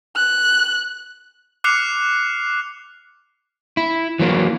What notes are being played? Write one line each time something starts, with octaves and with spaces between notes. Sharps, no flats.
F#6
D6 F6 F#6 C7 C#7 F7
E4
E3 F#3 A#3